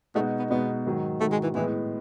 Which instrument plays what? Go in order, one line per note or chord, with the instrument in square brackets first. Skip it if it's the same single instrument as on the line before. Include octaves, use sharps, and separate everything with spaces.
[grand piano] B2 G#3 D#4 F#4 [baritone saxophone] A3
[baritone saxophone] B3
[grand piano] B2 G#3 D#4 F#4 [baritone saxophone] B3
[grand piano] G#2 D#3 F#3
[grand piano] G#2 D#3 F#3 [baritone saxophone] A3
[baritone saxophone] G#3
E3
[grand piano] A2 G#3 B3 [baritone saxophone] E3